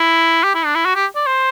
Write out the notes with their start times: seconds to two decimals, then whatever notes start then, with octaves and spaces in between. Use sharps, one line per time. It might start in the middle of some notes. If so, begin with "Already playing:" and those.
Already playing: E4
0.44 G4
0.55 E4
0.66 D4
0.75 E4
0.86 F#4
0.96 G4
1.16 D5
1.27 C5